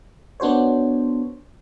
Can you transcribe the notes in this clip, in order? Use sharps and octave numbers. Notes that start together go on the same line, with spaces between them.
B3 D4 F#4 C5 C#5